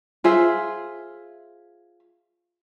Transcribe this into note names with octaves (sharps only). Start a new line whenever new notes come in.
F4 G#4 C5 E5